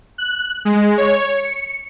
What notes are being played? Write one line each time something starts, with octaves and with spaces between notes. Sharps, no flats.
F#6
G#3
C#5
C#7